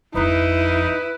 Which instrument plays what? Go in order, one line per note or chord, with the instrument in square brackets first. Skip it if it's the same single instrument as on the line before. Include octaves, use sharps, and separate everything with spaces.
[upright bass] G#1 F2 [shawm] D#4 [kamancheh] E4 [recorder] B4